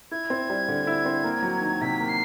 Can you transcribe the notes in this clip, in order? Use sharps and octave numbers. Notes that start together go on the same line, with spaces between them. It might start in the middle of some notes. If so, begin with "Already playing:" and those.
E4 G#6
C4
G3
D3
E4
C4
A#3
F#3
D#3
C3 B6
A#3
C7